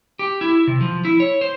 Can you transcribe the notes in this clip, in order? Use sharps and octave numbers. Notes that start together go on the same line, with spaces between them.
G4
E4
C3
F3
E4
C#5
C5